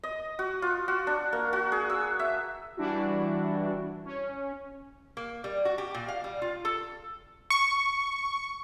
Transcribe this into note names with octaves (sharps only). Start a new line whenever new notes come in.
D#5
F#4
F4
F#4
D4
A#3
F#4
G#4
E6
E5
E3 G3 D4 E4 F#4
C#4
A#3
G3
F#4
G4
A#2
F5
G3
F4
A4
C#6